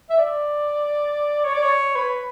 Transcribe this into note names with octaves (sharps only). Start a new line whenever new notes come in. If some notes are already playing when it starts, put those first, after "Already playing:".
E5
D5
C#5
D5
C#5
B4